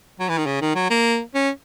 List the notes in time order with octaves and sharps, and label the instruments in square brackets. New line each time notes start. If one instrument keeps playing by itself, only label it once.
[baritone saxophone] F#3
E3
D#3
C#3
D#3
F#3
A#3
C#4